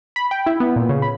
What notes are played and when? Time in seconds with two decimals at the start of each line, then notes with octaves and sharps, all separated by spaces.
0.16 B5
0.31 G5
0.46 E4
0.60 B3
0.76 A#2
0.89 C#3
1.02 B5